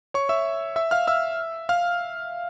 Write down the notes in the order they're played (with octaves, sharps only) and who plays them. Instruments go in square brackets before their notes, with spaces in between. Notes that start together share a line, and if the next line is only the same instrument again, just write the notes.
[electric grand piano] C#5 C#6
E5 E6
E5 E6
F5 F6
E5 E6
F5 F6